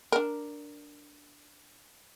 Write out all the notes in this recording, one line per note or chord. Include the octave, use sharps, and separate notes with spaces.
D4 A#4